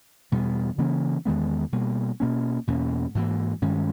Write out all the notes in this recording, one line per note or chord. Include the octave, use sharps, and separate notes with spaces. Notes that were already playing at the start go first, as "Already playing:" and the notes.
E2 B2 G3 B3
C#3 E3 A#3 C#4
E2 D#3 G#3 B3
B2 G3 A#3
B2 A#3 C#4
E2 B2 A#3 C#4
G#2 E3 A#3
G2 D#3 G#3 C#4